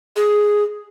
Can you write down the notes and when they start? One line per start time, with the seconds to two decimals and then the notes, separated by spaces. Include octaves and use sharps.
0.16 G#4